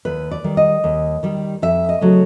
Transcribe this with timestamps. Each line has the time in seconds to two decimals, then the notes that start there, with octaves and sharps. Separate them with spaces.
0.05 D#2 B4
0.31 D5
0.44 D#3 G3
0.57 D#5
0.84 D#2
1.23 D#3 G3
1.62 F2 E5
1.89 D#5
2.01 C#3 F#3 A3